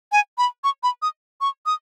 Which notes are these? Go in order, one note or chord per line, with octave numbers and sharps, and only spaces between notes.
G#5
B5
C#6
B5
D#6
C#6
D#6